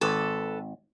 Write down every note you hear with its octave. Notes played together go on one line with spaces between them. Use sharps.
G#1 A4 B4